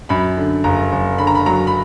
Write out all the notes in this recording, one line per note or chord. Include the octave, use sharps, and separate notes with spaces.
F#2 B5
D3
F#1 A#5
F#1
D3 B5
A#5
B5
F#3 A#5
B5